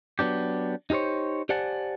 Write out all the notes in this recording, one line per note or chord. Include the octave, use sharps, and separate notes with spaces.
F#3 B3 D4 G4
D#4 G4 G#4 C5 C#5
G4 C5 D5 F#5 G#5 A5